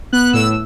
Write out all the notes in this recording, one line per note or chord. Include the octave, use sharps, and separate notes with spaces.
B3 F#6
A2 E6